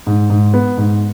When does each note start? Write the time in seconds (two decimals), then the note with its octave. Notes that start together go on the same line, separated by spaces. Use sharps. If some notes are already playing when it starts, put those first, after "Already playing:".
0.07 G#2
0.30 G#2
0.54 B3
0.77 G#2